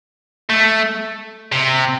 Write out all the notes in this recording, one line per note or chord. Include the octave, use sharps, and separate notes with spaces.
A3
C3